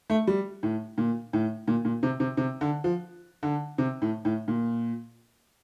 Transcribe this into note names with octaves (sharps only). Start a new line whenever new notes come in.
A3
G3
A2
A#2
A2
A#2
A#2
C3
C3
C3
D3
F3
D3
C3
A2
A2
A#2